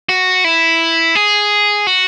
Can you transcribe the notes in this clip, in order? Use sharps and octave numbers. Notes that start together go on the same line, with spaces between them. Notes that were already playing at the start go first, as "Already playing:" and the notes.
F#4
E4
G#4
F#4